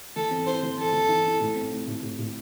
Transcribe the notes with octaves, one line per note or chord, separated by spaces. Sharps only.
E3 A4
C4
E4 C5
E3
C4 A4
E3
E4
E4
A2
C4
A2
A2
A2
A2